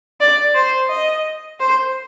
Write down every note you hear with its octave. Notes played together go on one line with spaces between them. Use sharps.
D5
C5
D#5
C5